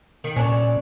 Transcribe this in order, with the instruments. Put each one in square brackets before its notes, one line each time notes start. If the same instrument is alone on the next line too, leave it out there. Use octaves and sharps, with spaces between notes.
[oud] D#3
[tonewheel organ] A#2 [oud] C#4 D4